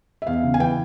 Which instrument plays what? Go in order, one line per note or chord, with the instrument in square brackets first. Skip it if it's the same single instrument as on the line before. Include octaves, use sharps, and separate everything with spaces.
[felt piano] E5
E2 F5
C#3
G#5
E3 G5